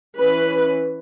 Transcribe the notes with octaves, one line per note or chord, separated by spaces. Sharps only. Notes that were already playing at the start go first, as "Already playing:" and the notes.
E3 C#4 B4